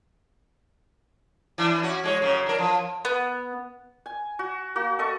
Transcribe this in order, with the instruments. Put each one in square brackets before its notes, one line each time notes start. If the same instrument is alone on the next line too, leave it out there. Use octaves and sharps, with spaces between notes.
[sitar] E3 D4
C#4 F#4
G#3 G4 C#5
F#2 C#3
D4 A#4
F3
[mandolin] B3
[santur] G#5
F#4
A#3 F#4
A4 D#5 C#6